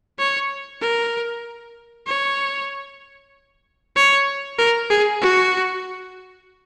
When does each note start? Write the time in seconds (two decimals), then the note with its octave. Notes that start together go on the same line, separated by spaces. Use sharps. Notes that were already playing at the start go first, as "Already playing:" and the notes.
0.19 C#5
0.81 A#4
2.07 C#5
3.96 C#5
4.59 A#4
4.90 G#4
5.21 F#4